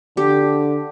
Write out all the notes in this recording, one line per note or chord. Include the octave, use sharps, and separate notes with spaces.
D3 G4